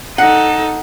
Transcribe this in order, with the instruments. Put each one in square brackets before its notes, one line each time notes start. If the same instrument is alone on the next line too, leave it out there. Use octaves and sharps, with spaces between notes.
[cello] D#4 A4 [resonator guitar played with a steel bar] F#5